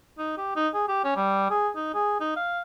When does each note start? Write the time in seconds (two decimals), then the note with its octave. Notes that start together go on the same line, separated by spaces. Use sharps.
0.19 D#4
0.38 G4
0.56 D#4
0.74 G#4
0.88 G4
1.04 C#4
1.16 G3
1.51 G#4
1.76 D#4
1.94 G#4
2.21 D#4
2.36 F5